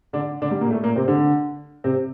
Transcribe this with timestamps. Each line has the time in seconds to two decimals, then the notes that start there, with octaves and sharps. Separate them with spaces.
0.13 D3 D4
0.42 D3 D4
0.51 G3
0.61 A#2 A#3
0.70 A2 A3
0.83 A#2 A#3
0.96 C3 C4
1.08 D3 D4
1.84 C3 C4